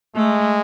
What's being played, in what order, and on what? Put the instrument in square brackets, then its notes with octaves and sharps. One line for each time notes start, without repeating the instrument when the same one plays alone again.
[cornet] G#3 [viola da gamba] A3